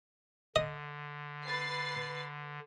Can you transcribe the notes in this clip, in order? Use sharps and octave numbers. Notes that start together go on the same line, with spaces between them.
D3 D#5
B4 A6 C7